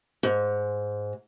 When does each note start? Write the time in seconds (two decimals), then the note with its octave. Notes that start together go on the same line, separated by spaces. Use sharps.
0.23 G#2